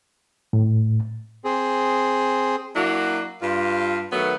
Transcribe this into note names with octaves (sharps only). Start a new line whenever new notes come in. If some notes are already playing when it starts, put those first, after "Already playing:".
A2
C4 G#4
F#3 A#3 D4 E4 F#4
G2 F4
D#3 F#3 A3 B3